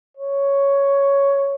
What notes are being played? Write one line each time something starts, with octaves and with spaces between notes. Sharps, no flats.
C#5